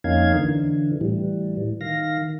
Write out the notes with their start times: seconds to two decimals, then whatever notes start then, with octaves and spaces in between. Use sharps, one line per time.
0.04 F2 A#3 C#4 D#4 F5 G#6
0.35 D3 E3
1.01 A2 E3 G3
1.81 D#3 F5 A#6